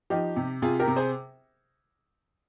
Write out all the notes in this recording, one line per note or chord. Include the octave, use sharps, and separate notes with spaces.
F3 D#4 G4
C3
C3 F4 G#4
G4 A#4
C3
G#4 C5